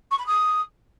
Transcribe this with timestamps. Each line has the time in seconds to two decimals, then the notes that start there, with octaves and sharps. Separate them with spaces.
0.11 C#6
0.18 B5
0.26 D#6